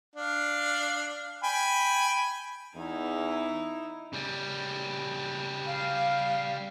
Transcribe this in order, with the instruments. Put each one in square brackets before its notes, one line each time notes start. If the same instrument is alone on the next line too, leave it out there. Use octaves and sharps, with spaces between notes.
[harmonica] D4 F5
G5 G#5 B5
[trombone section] E2 [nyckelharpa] D#4 E4
[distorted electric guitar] C#3 G3
[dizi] F5